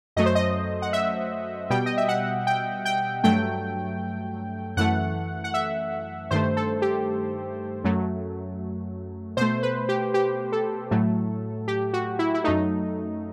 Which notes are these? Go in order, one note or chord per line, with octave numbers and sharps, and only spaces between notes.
F#2 F#3 A3 D#5
C5
D#5
F#5
E5
B2 G3 G5
D#5
E5
F#5
G5
G5
G2 F#3 A3 G5
F#2 E3 A3 F#5
F#5
E5
G2 D#3 A3 C5
A4
G4
F#2 F#3 A3
B2 A3 C5
B4
G4
G4
A4
A2 F#3 A3
G4
F#4
E4
E4
F#2 F#3 A3 D#4